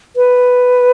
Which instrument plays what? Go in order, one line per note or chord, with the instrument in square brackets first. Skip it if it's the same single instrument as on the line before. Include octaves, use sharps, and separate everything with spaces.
[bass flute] B4